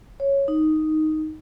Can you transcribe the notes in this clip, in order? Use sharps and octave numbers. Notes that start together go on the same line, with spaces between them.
C#5
D#4